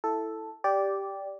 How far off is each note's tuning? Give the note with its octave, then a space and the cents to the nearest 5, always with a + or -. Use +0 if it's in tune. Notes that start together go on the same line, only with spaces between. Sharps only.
E4 +0 A4 +0
G4 +0 D5 -10